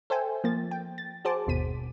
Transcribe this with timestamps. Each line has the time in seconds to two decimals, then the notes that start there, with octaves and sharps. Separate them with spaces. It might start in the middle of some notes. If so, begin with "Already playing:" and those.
0.10 A4 C5 E5 G5 G#5
0.44 F3 A#3 A6
0.71 G5
0.98 A6
1.25 F#4 G#4 C5 A5 D6
1.47 G1 D#2 B2 B6 D#7